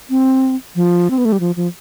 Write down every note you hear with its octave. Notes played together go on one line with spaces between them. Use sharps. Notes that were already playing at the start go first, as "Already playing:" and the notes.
C4
F3
C4
B3
A3
G3
F3
F3